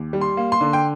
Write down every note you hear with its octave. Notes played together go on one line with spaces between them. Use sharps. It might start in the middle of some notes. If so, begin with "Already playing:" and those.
Already playing: D#2
G3
C6
A#3
C6
D3
G5